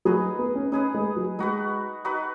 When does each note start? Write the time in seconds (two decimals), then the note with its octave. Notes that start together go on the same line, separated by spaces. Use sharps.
0.05 F#3 D#4 G#4 B4 D#5
0.39 B3
0.55 C#4
0.72 C#4 D#4 G#4 B4 D#5
0.94 G#3
1.16 F#3
1.39 G#3 D#4 F#4 B4
2.05 D#4 F#4 B4